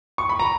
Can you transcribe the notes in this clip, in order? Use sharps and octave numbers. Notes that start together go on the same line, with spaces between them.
C#6
B5
A#5